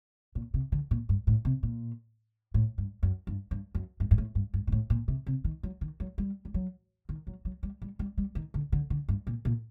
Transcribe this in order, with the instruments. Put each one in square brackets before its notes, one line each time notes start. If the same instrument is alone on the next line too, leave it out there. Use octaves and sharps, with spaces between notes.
[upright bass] A#2
C3
D3
A#2
G2
A2
C3
A#2
A2
G2
F#2
G2
G2
F#2
G2
G2
A2
G2
G2
A#2
A2
A#2
C3
C3
D#3
F#3
D#3
F#3
G3
G3
F#3
D#3
F#3
F#3
G3
G3
G3
G3
D#3
D3
D3
D3
G2
A#2
A#2